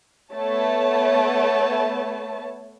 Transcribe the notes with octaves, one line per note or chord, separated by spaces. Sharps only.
A3 B3 C#5 A5